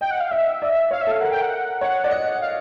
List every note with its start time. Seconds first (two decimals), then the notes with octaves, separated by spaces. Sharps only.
0.01 D#5 G5
0.11 F#5
0.21 F5
0.31 D#5 E5
0.62 D5
0.91 C#5 F5
1.01 E5
1.07 A4 F5
1.21 A#4 F#5
1.32 G5
1.41 F#5
1.81 C#5 F#5
2.04 D5
2.11 D#5
2.41 F5